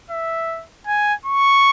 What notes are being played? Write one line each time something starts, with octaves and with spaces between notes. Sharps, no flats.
E5
G#5
C#6